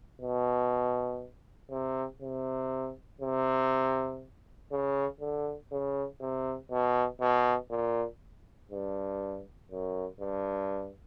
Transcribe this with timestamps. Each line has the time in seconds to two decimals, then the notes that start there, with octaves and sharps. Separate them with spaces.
0.22 B2
1.71 C3
2.22 C3
3.21 C3
4.72 C#3
5.20 D3
5.72 C#3
6.21 C3
6.72 B2
7.20 B2
7.70 A#2
8.72 G2
9.71 F#2
10.20 G2